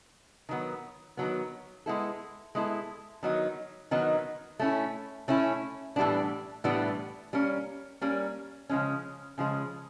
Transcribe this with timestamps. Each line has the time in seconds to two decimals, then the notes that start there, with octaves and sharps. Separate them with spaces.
0.49 D#3 F#3 B3
1.17 D#3 F#3 B3
1.86 G#3 B3 E4 A4
2.55 G#3 B3 E4 A4
3.23 D#3 F#3 B3 D#4
3.91 D#3 F#3 B3 D#4
4.60 A3 C#4 E4
5.28 A3 C#4 E4
5.96 A2 E3 G3 B3 D4
6.64 A2 E3 G3 B3 D4
7.33 G3 A#3 C#4
8.01 G3 A#3 C#4
8.69 C#3 F3 G#3 C#4
9.38 C#3 F3 G#3 C#4